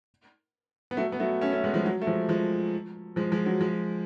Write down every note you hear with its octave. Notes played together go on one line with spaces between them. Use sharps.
B3
F#3 A3
B3
F#3 A3
A3 C#4
A3 C#4
G#3 B3
F3 G#3
F#3
A3
F3 G#3
F3 G#3
F3 G#3
F3 G#3
F#3
F3 G#3